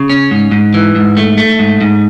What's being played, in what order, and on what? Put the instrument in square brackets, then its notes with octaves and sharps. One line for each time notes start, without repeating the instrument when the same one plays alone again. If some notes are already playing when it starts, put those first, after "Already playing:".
Already playing: [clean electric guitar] C#3
C#4
G#2
G#2
E3
G#2
A3
A3
G#2
G#2